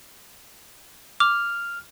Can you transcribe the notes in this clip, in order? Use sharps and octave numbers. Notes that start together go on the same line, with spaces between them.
D6 F6